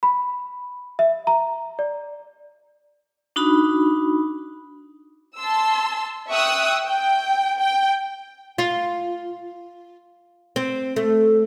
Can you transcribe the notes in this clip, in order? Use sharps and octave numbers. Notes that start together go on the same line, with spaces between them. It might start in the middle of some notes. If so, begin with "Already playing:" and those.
B5
E5
A#5
D5
D4 D#4 F#4 B5
A5 C6 E6
E5 G5 C#6 D#6 E6 F#6
G5
G5
F4
C4
A3